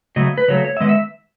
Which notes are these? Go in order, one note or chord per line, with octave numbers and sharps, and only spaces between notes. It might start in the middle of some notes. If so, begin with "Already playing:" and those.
C#3 F#3 A3 D#5
B4
C#3 F#3 A3 C#5
C#5
E5
D#3 G#3 B3 D#5
E5